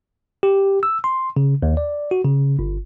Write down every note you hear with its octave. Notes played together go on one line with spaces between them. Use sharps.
G4
E6
C6
C#3
D#2
D5
F#4
C#3
G1